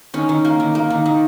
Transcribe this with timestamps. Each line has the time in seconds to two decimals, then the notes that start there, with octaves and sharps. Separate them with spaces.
0.14 D#3 C#4
0.29 D#3
0.45 A#3
0.60 D#3
0.75 A#3
0.90 D#3
1.06 D#3